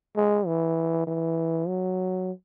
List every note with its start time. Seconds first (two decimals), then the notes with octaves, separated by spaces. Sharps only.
0.16 G#3
0.46 E3
1.07 E3
1.67 F#3